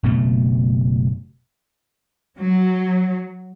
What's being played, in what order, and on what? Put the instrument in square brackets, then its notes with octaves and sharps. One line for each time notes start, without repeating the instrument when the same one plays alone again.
[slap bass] F#1 B2 A3
[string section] F#3